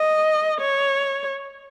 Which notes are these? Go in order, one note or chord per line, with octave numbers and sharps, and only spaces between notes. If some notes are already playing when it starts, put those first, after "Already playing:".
Already playing: D#5
C#5